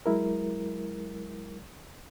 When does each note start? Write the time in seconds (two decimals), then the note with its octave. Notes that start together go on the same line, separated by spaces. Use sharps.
0.06 F#3 G#3 E4 A#4